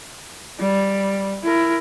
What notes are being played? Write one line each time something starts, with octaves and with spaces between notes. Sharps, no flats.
G3
E4 A#4